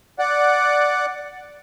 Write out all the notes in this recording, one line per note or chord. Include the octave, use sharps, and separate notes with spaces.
D5 F#5